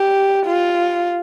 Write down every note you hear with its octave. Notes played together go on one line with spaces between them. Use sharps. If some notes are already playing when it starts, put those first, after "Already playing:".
Already playing: G4
F4